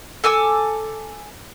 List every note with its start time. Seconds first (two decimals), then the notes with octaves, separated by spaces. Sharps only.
0.24 A4 G#5 D6 E6